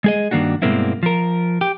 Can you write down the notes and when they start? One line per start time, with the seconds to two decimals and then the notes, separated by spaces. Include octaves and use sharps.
0.04 G#3 G#4 D#5
0.31 G2 D#3 A#3 D4 F#4
0.62 G2 B2 G#3 A#3 C4 E4
1.03 F3 A#4
1.61 G4